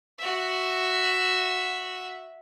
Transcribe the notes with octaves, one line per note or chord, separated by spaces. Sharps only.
F#4 E5